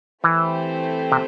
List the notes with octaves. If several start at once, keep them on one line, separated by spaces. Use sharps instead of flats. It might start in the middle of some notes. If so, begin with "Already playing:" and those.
E3 A3 C4 E4 G4 C5
C3